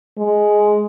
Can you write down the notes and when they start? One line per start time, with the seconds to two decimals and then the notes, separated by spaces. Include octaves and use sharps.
0.18 G#3